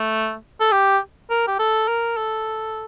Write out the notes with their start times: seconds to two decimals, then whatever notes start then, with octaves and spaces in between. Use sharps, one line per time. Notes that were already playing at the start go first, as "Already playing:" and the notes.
Already playing: A3
0.60 A4
0.72 G4
1.30 A#4
1.47 G4
1.59 A4
1.88 A#4
2.17 A4